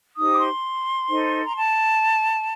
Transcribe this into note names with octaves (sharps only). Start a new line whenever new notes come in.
D#4 G4 C5 D#6
D6
C6
D#4 A4 C5
A#5
A5